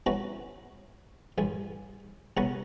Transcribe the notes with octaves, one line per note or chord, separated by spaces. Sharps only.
C4 C#4 E4 F#4 B4 A#5
A1 G2 G#5
C2 B3 C#4 B4 G#5 A#5